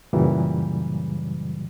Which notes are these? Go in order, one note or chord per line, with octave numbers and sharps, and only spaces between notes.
F#2 A#2 C#3 E3 F#3 G3